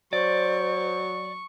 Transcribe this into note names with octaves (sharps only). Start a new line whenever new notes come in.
F#3 C5 D5 C#6